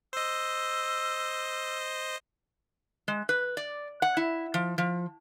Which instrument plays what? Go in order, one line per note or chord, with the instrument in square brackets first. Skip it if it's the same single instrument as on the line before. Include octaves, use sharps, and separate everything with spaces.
[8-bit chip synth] C5 D#5 [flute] E6
[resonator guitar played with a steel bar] G#3
B4
D5
F#5
E4
F3
F3